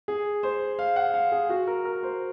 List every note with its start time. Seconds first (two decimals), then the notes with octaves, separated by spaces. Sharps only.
0.08 G#4
0.43 C5
0.79 F5
0.96 F#5
1.14 F5
1.32 G#4
1.49 F#4
1.67 A#4
1.85 A#4
2.03 C5